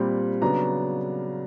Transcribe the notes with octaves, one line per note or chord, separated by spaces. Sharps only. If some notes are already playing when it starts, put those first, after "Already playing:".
Already playing: A#2 G3 C4 B5
C#3 F#3 B3 D4 A#5